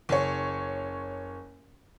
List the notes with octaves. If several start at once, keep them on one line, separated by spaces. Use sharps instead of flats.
F#1 C#5